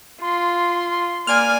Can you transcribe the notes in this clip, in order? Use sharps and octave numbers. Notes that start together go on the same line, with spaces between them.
F4 C6
A#3 D5 G#5 F6